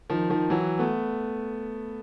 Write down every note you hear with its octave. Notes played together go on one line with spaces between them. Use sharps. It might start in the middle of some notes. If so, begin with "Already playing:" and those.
D#3 F3
D#3 F3
E3 F#3
A3 B3